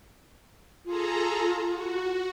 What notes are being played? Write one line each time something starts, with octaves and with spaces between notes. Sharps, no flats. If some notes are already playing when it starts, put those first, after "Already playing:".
F4 G#4 A4 A#5
F#4